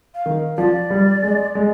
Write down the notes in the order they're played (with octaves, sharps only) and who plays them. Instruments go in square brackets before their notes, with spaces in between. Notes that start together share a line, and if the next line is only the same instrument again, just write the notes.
[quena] F5
[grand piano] D#3
[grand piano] F3 [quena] D5
[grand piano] G3
G#3
G#3